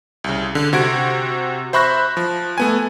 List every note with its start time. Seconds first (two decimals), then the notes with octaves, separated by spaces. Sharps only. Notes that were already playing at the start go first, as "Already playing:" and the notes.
0.24 C2 C#3
0.55 D3
0.73 C3 F#4 G#6 D7
1.73 C5 E5 B5 C#6 F#6 A#6
2.17 F3
2.58 A3 B3 G#5